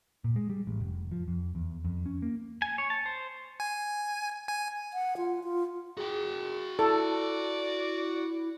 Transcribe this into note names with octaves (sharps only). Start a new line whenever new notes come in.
A#2
G#3
G3
A1
F1
F3
F2
E2
F2
C#4
A#3
G#5
C#5
A5
C5
G#5
G#5
F#5
F4
F4
F#4 G#4 G5
E4 A4 D5